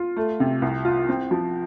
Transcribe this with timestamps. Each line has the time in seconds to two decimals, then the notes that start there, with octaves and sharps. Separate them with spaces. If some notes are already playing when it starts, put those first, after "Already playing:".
Already playing: F4
0.16 A3
0.40 C3
0.62 C2
0.85 F4
1.09 C4
1.31 F3